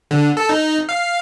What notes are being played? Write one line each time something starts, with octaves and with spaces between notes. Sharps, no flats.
D3
A4
D#4
F5